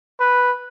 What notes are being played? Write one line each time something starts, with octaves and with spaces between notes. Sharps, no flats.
B4